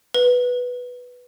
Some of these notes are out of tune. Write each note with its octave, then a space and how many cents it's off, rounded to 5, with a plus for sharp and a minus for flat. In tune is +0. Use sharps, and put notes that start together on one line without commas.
B4 +0